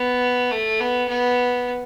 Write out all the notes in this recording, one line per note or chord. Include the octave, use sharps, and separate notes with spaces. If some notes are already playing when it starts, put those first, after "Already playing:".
Already playing: B3
A3
B3
B3